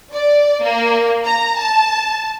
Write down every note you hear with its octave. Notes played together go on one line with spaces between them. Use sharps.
D5
A#3
A#5
A5